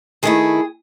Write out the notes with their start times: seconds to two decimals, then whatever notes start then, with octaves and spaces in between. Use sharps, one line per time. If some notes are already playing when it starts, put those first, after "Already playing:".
0.23 D#3 A3 E4 G#4